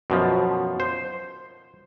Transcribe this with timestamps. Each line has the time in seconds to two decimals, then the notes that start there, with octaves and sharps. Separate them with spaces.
0.10 F#2 B2 F3
0.80 C5